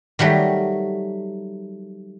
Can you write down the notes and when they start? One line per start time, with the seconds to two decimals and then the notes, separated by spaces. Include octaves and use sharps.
0.19 D#3 F#3 G3 A3